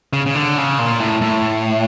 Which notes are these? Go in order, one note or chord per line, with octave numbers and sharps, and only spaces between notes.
C#3
C#3
D3
C#3
A#2
A2
A2